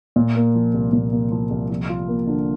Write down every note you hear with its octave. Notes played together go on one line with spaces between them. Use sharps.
A#2
A#3
F3
C2
A#2
A#3
F3
C2
F3
F4
A#3
D3